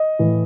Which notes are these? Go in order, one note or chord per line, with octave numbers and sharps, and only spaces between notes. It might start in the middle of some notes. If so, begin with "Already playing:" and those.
Already playing: D#5
A2 E3